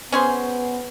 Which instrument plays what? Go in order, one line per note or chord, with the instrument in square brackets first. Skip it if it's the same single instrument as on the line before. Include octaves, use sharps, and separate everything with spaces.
[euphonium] B3 [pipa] C#4 G#4 C5